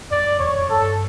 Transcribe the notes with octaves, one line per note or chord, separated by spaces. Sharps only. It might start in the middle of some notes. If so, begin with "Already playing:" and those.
F#2 D5
E2 C#5
F#2
G2 A4